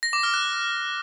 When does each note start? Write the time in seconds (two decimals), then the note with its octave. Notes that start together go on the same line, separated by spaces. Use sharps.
0.03 A#6
0.13 D6
0.23 F6
0.34 F#6